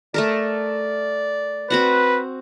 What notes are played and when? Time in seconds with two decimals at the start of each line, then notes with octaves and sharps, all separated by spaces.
0.14 A3 A4 A#4 D5
1.70 C4 F#4 B4 F#5